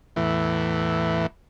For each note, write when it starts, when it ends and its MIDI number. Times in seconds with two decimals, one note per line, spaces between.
0.16 1.26 40
0.16 1.26 45
0.16 1.26 52